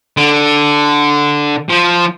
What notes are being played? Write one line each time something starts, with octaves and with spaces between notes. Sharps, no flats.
D3
F3